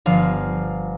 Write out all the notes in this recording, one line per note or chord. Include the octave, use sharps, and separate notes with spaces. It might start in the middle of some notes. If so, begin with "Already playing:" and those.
G1 F3 F5 C7